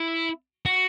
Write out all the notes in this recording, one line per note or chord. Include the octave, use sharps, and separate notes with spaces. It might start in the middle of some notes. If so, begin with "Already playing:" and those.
Already playing: E4
F#4